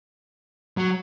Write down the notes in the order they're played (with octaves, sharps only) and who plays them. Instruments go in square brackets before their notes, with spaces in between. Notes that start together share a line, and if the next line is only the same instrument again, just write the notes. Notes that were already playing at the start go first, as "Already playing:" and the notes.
[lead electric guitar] F#3